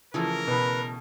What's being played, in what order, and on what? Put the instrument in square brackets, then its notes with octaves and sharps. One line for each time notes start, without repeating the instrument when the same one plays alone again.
[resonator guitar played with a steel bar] C#3 E3 A3 [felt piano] F3 [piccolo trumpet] A#4
[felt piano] B2 [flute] B4